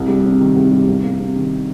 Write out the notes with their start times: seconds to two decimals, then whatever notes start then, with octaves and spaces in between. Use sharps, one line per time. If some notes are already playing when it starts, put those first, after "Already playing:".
Already playing: C2
0.08 G3
0.25 C3
0.41 D#3
0.56 C2
0.72 G3
0.88 C2
1.03 A#3
1.20 C3
1.36 D#3